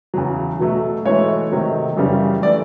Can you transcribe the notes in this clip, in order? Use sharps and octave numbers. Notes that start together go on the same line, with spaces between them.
E2 C#3 F#3
B2 F#3 A3
G#2 E3 A3 C#5
C3 D#3 F#3 A3
F#2 C#3 E3 G3
E3 A3 D5